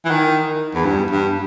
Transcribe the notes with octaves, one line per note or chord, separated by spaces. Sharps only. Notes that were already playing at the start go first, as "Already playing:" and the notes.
E3
D#3
E2
G2
G2